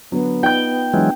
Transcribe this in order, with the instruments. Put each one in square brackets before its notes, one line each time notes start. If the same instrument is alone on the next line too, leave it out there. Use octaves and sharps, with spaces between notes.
[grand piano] D3 F#3 [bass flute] B3
[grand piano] D#4 F4 [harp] G5 G6
[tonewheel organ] E3 F#3 G#3 [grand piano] D4 F4